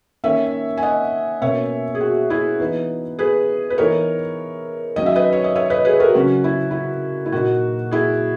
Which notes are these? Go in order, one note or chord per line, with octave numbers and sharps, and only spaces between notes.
D#3 A#3 C#4 C#5 E5
G#5
D#5 F#5
B2 A#3 C#4 C#5 E5
G#4
F#4
E4 G#4
E3 B3 D#4
G#4 B4
B4
E3 B3 D#4 A#4 C#5
D#3 F#3 C#4 D#5
E5
B4 D#5
C#5
D#5
C#5 E5
B4 D#5
G#4 B4
F#4 A#4
C#3 F#3 C#4 F#4
E4
E4
E4
A#2 A#3 D#4 F#4
E4 G#4